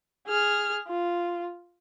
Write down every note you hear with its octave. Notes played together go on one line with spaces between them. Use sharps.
G#4 F6
F4